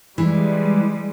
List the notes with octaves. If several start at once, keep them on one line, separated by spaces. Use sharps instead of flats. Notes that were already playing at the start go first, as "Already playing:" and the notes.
E3 G3 G#3